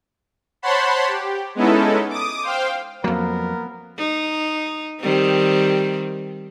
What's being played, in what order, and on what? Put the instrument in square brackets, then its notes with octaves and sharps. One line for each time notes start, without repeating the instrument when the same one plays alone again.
[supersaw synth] C5 C#5 F#5 A5 B5 C6
G4
G#3 B3 C#4 D#4 E4 A4
D6 D#6
C5 F5 G5
[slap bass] F2 F#3 [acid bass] A#3 [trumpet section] B3 A#4
[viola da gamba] D#4
D#3 G3 C4